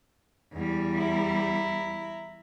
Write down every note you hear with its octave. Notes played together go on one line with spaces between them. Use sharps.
E2 G3
E4 A#5